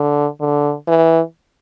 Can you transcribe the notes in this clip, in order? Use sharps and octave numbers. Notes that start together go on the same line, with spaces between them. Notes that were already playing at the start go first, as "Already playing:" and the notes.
Already playing: D3
D3
E3